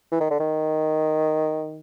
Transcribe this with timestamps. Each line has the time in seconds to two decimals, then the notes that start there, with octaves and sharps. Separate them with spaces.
0.11 E3
0.20 D#3
0.30 D3
0.40 D#3